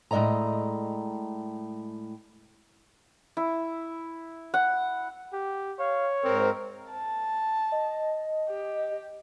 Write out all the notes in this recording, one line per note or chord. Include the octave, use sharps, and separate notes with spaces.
A2 G#3 C4 D5 D#5 A#5
E4
F#5
G4
C#5 F5
G#2 C4 A#4
A5
D#5
G4